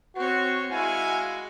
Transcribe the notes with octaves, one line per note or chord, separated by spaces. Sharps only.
C4 F#4 C#5
G#3 E4 F#4 F5 F#5 G#5